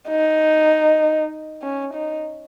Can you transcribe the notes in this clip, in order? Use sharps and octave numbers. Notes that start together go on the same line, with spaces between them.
D#4
C#4
D#4